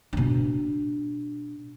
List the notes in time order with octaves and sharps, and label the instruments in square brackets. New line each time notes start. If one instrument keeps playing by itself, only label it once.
[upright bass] B2 D4